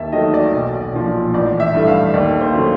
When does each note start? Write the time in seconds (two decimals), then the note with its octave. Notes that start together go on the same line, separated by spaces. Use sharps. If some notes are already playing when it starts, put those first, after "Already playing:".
Already playing: D#2 E5 A5
0.12 D#3 F#3 A3 D#5
0.34 D5
0.53 B1
0.93 A#2 F3
1.34 A1 D5
1.60 E5
1.73 G2 E3 A3
1.87 F5
2.14 D#2 D5
2.41 C5
2.54 C#3 F#3 A3